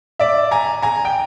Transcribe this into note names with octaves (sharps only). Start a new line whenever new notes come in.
D5 E5
G#5 A#5
G#5 A#5
G5